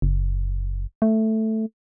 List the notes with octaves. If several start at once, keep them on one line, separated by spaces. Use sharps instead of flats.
F#1
A3